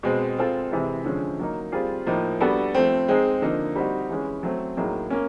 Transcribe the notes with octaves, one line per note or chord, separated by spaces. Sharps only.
B2 G#3 C4
G#3 C4 F4 A4
C3 E3 G#3 C4
D3 F3 G#3 C#4
F#3 A#3 D#4
G3 C4 F4 G#4
A2 F3 A#3 D#4
G3 B3 D4 F#4 A4
F3 A3 C4
G#3 C4 D#4 G#4
D3 F3 A#3 D#4
G3 C4 D#4 F#4
E3 G#3 C#4
F#3 A3 C4
A2 F#3 A#3 D#4 G#4
A#3 C#4